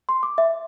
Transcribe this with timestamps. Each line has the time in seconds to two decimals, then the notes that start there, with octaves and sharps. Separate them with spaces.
0.09 C6
0.23 D6
0.38 E5